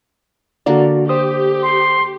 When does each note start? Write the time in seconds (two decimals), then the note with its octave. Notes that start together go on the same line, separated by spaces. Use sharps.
0.66 D3 A#3 F#4 A#4 D5
1.09 G4 C5 D#6
1.63 C6